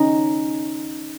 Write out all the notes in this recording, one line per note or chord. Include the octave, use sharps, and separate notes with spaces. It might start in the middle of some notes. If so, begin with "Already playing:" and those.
Already playing: C#4 D#4